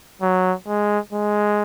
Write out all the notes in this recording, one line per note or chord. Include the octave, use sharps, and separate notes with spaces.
F#3
G#3
G#3